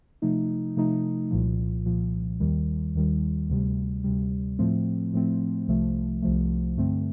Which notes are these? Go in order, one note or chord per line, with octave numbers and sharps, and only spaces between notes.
C3 F3 A3 D#4
C3 F3 A3 D#4
C2 A#2 F3
C2 A#2 F3
D#2 D#3 G3
D#2 D#3 G3
D2 C3 G3
D2 C3 G3
A2 F3 A3 C4
A2 F3 A3 C4
C2 C3 F3 A3
C2 C3 F3 A3
G2 D3 A3 C4